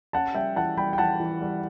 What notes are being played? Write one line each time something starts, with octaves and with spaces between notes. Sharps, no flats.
C#4 F#5 A5
G3 E5 G5
E3 F#5 A5
G3 G5 B5
G5
E3 F#5 A5
E3
G3